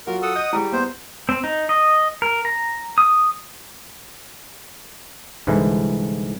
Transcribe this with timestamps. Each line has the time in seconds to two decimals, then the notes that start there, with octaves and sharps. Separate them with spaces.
0.07 F#3 F4 F#4 A#4
0.22 A4 F#5 D#6
0.36 D#5 G6
0.53 G3 E4 G4 G#4
0.73 B3 C5
1.29 C4
1.44 D#4
1.69 D#5
2.22 A#4
2.45 A#5
2.98 D#6
5.47 C2 G#2 D3 E3